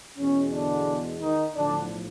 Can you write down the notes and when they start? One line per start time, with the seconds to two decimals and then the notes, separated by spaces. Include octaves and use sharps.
0.18 E2 B2 G#3 C#4
0.52 D3 D4
1.21 D#3 D#4
1.55 B1 A2 D3 F3 D4